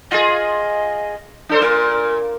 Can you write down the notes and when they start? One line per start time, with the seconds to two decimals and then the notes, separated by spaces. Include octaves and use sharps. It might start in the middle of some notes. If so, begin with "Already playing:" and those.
0.11 F4 G#4 D#5
1.49 D4 A4 C5
1.61 A#2 A#4